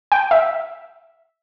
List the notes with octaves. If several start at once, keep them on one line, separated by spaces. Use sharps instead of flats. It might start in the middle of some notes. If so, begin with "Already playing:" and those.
G5
E5